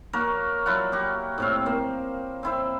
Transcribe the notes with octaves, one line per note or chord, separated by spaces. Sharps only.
A#3 F#4 A#4 C#5
F#3 E4 F4 F#5
F#4 G4
A2 C3 F5
A#3 C5
C4 E4 C5